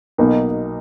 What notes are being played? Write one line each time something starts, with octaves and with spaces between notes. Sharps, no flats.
B1 B2 A#3 D#4